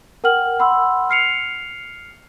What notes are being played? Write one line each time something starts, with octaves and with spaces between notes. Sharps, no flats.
A#4 F#5 G5 F6 F#7
F#5 B5 C6 E6
F6 C7 C#7 F7